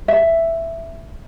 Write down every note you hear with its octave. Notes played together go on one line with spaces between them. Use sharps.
E5